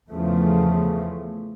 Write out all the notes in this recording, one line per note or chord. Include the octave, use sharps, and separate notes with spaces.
E2 C#3 F3 A3